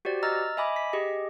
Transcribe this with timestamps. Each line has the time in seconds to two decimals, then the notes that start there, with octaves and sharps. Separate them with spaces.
0.05 F#4 G4 C5 D5
0.23 D#5 A#5 E6 F6 A6
0.57 D#5 E5 G#5 B5 D6
0.76 B6
0.93 G4 G#4 D#5